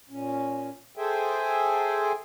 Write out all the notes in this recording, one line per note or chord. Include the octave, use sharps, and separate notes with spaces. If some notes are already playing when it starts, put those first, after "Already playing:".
A#2 C#4
G#4 A4 C5 E5 G5 G#5